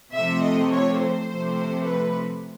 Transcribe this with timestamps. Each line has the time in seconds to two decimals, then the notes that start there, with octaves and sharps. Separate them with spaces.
0.13 C3 F3 A3 E5
0.42 D#5
0.71 C#5
0.99 C5
1.28 C3 F3 A3
1.85 B4